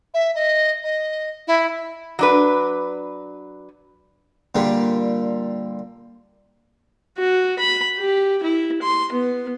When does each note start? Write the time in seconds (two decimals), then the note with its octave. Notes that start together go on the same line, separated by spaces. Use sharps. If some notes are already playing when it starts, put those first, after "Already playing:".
0.14 E5
0.35 D#5
0.84 D#5
1.47 E4
2.19 F#3 D4 B4
4.55 A#2 D3 G3
7.18 F#4
7.59 B5
7.98 G4
8.43 E4
8.82 C6
9.12 B3